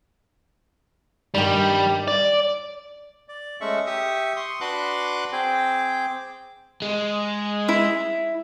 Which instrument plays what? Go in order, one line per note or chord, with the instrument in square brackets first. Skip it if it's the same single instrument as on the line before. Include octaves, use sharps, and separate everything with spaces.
[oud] G2 D#3 G4 [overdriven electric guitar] G3
[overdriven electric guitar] D5
[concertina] D5
G#3 A3 C#4 E5 C#6
G4 E5 C#6 D#6
C6 C#6 D#6
D4 F#4 B4 C6 D6 F#6
C4 G#4 G5 D6
[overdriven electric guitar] G#3
[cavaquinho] E4